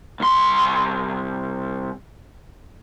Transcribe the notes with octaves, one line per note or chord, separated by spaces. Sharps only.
C2 C6